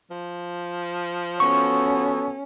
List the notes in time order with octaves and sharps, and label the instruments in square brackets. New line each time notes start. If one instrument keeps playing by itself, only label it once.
[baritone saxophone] F3
[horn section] B3 F#4 A4 [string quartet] C#4 [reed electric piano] C#6